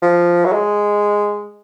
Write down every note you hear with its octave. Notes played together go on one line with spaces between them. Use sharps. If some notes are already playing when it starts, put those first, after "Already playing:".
F3
F#3
G#3